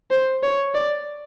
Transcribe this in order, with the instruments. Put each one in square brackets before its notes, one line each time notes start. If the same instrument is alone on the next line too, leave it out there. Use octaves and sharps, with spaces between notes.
[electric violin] C5
C#5
D5